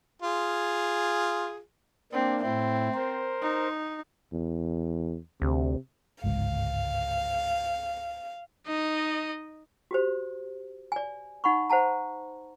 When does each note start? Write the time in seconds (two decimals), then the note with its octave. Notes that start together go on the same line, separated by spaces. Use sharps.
0.22 F4 G#4
2.13 A#3 C4 D4
2.42 A2 C4 E4
2.95 A#4 C5
3.42 D#4
4.33 E2
5.42 D2 C3
6.24 G1 C#2 G#2 F5
8.67 D#4 D#5
9.91 F#4 G4 C5
10.92 D5 G#5
11.44 D#4 F#5 B5 C#6
11.70 C5 F#5 A5 A#5